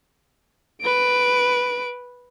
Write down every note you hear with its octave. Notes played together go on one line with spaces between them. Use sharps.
B4 D7